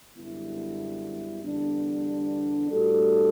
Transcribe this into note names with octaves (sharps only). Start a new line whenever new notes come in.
F#2 D3 G3 B3 E4
E2 D3 G3 B3 D4
A2 G3 D4 F#4 A4